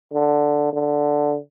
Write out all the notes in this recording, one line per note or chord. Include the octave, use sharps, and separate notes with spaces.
D3
D3